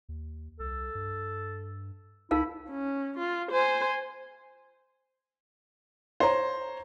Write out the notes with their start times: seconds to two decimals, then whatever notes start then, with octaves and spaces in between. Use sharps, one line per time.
0.09 D#2
0.60 C2 A4
0.95 G2
2.31 C#2 D#4 E4 A#4 F5
2.70 C#4
3.18 F4
3.52 C5 G#5
6.20 C5 C#5 A#5